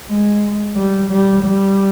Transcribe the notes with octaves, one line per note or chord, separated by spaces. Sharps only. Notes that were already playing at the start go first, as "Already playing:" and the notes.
G#3
G3
G3
G3